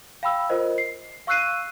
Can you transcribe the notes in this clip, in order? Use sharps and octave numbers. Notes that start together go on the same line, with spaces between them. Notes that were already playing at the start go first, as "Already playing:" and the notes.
F5 G5 B5 E6
F4 A#4 C5 D#5
C7
F5 C#6 E6 F#6 C7 D#7